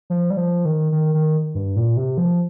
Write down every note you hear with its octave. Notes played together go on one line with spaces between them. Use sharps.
F3
G3
F3
D#3
D#3
D#3
G2
A#2
C3
F3